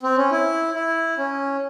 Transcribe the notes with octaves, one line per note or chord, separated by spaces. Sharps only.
C4
C#4
E4
E4
C#4